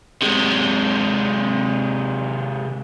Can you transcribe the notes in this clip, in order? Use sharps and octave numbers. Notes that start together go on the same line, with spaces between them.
C3 G#3